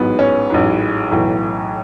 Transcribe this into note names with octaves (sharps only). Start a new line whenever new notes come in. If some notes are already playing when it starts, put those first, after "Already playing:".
Already playing: A1 G#2 F#3 B3
C#4
A1 G#2 F#3
B1 A2 E3